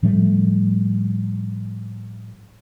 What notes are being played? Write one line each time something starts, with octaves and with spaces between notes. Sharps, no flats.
A2 F3 G3 A3